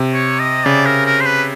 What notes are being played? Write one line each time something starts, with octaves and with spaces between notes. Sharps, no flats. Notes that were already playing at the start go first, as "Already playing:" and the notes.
Already playing: C3
C#5
D#5
C#3 D5
A#4
A#4
C5
B4